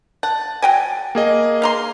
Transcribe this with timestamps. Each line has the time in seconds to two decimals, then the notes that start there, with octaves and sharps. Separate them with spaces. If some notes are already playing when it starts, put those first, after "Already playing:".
0.23 F#5 A5
0.62 F#3 G5 G#5
1.15 A#3 G#4 D#5
1.62 F5 A#5 C6